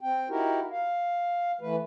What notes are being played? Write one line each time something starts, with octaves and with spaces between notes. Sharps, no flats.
C4 G5
D#4 E4 F#4 G4 A#4
F5
E3 A3 B4